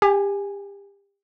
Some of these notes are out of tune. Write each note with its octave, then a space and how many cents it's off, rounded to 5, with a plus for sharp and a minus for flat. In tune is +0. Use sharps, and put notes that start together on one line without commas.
G4 +30 G#5 +0